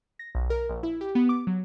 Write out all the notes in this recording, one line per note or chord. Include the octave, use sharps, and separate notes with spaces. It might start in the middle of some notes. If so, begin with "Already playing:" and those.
A#6
B1
A#4
A#1
E4
G4
B3
D6
F#3